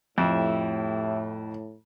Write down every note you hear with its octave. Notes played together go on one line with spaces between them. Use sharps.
F2 A2 E4 G4 E5